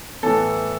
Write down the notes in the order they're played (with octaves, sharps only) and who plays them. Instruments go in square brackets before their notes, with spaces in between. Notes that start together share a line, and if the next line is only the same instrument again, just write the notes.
[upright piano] A2 E3 B3 A4